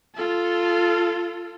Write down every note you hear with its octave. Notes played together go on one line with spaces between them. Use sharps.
F4 A4